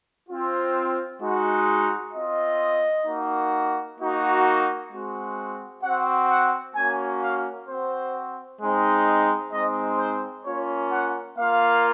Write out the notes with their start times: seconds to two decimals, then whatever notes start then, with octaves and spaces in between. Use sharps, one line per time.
0.29 C4 F4
1.20 G#3 D#4 F#4
2.13 C4 F4 D#5
3.05 A#3 D#4 F#4
3.98 A#3 D#4 F#4
4.91 G#3 C4 F#4
5.82 C4 F#4 F#5
6.29 F#5
6.75 A#3 C#4 F#4 G#5
7.21 F5
7.67 C4 F#4 C5
8.60 G#3 C4 D#4
9.52 G#3 C4 D#4 D#5
9.98 C5
10.45 A#3 C#4 F4 C#5
10.91 F#5
11.37 A#3 F4 F5